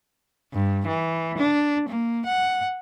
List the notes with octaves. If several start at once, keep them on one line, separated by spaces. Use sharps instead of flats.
G2
E3
D4
A#3
F#5